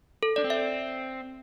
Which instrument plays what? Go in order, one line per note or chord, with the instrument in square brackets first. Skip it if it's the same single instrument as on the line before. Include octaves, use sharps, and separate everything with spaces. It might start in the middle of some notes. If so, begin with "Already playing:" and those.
[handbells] A4
[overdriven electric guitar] D4 [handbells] D5
[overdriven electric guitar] C4
[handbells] E5